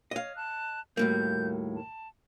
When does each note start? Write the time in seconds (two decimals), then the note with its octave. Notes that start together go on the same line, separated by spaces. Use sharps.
0.11 C#5 D#5 F5
0.35 A5 F#6
0.97 D#2 A2 G3 A3 A#3 F#4 G6
1.75 A5